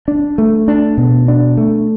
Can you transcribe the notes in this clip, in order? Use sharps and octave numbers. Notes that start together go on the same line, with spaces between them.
D4
A3
D4
B2
D4
A3